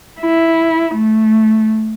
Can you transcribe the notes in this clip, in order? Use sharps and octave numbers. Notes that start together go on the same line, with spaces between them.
E4
A3